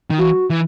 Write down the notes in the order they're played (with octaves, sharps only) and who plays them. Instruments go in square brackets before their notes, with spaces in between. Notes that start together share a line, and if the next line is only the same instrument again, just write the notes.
[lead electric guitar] D#3
[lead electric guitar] E3 [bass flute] F#4
[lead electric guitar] E3